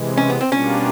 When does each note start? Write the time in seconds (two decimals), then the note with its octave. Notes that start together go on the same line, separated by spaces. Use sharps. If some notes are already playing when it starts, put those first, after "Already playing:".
Already playing: C3 E3 G#3
0.18 C#4
0.30 B3
0.41 C4
0.52 B2 G3 A#3 C#4 D4 F4